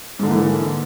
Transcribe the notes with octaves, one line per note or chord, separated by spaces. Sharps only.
G#2 D3 E3 A#3